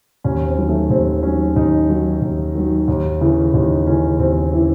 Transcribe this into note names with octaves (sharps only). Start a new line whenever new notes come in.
D#2 C#4
C4
D#3 F#3
A3
D#2 C4
D#3 F#3 C#4
D#2 D#4
D#3 F#3
D#2
D#3 F#3
D#2
C#3 E3
D#2 D#4
C#3 E3 C#4
D#2 C4
C#3 E3